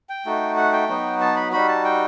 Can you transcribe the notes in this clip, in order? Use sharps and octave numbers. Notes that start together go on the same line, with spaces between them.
G5
A3 D#4 F#4
F#5
G5
F#3 B3 D#4 F#4
A5
B5
G3 D#4 F#4 B5
A5
G5